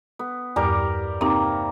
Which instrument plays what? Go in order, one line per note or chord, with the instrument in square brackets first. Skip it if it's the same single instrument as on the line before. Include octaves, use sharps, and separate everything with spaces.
[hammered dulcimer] B3
[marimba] E2 G2 [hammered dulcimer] G3 A#4 D6
[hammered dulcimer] C3 A#3 [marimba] C4 D#4